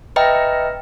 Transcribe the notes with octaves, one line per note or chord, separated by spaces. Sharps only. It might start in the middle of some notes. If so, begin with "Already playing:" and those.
B4 D#5 E5 G5 A#5